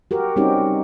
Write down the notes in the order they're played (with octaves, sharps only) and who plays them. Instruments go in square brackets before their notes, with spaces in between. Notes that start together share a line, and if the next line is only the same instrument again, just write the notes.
[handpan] F#4 G4 A#4
G3 C4 C#4 D#4 F#4 G4